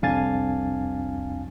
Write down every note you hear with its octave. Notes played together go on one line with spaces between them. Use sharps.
C2 F2 D4 F5 G#5 A6